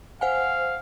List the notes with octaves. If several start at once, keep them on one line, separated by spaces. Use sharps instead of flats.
C5 F5 F#5 G#5